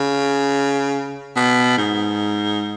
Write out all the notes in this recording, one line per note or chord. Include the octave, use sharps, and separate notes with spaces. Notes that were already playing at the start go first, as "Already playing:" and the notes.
Already playing: C#3
B2
G#2